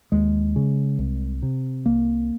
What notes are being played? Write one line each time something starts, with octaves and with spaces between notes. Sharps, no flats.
D#2 G#3
C#3
C2
C3
C2 A#3